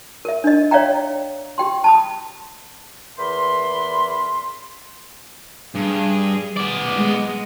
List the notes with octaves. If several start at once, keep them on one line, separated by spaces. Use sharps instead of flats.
A#4 E5
D4 D#5
C#5 D5 E5 F5 G5 A#5
G4 G5 C6
A5 B5 D#6
E2 E3 A#4 B5 C6
G2 G#4
B3 D5
G#3